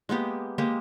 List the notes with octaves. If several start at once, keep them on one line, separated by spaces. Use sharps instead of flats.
G#3 A#3 B3 G4
G#3 A#3 G4